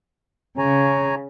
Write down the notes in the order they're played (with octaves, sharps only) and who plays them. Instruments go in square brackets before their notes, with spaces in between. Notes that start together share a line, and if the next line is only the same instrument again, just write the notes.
[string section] C#3 [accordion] C#5 G#5 A#5